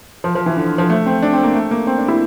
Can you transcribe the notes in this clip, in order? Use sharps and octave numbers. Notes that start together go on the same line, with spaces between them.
F3
F3
E3
D3
F3
A3
C4
D4
C4
A#3
A3
A#3
C4
D4
E4